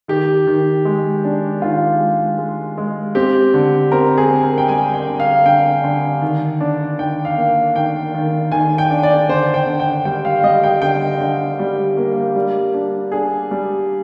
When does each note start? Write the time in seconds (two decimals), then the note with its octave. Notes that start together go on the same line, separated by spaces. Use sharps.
0.08 D#3 G4
0.47 D#3
0.85 G#3
1.24 D4
1.62 D#3 F4
2.00 G#3
2.38 G#3
2.78 G#3
3.15 C4 G4
3.54 D3
3.92 C4 A#4
4.18 G#4
4.31 C4
4.43 A#4
4.58 G5
4.69 G3 G#5
4.94 G5
5.08 D3
5.20 F5
5.45 D3 G5
5.84 D3
6.22 D#3
6.61 D4
6.99 D#3 G5
7.25 F5
7.37 A#3
7.75 D#3 G5
8.14 D#3
8.52 D#3 G#5
8.78 G5
8.90 D4
9.03 D5
9.29 D3 C5
9.54 G5
9.67 D3
9.80 G5
10.05 G3 G5
10.25 F5
10.43 G3 D#5
10.64 G5
10.82 D3 G5
11.20 D3
11.59 G3
11.97 A#3
12.35 G3
12.74 D4
13.12 D4 G#4
13.51 G3